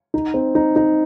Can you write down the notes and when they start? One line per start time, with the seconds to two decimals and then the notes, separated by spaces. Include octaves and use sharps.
0.14 D#4
0.34 C4
0.55 D#4
0.76 D#4